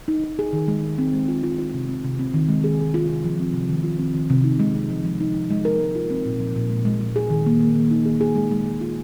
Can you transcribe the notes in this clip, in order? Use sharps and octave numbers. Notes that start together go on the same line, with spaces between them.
D#4
D#4
G#4
D#3
G#3
G#3
C4
G#3
F4
F4
F4
C3
C4
C3
C4
D#3
G#3
G#4
G#3
F4
C3
F3
C4
C3
D#3
F4
C4
D#3
C3
D#4
G#3
C3
F3
F3
D#4
D#4
G#3
A#4
G#3
F4
C4
A#2
F3
A#2
G#3
G#3
G#3
G#4
D#3
A#3
A#3
D#3
D#4
G#4
G#4
G#3
G#3
G#3
F4